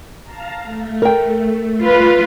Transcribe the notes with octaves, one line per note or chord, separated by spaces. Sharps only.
F5 A5 A#5
A3
A#4 G5
F4 B4